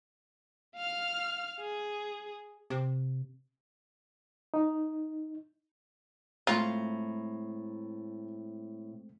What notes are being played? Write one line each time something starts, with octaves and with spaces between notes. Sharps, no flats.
F5 F6
G#4
C3
D#4
A2 G#3 A3 C4 F4 A#5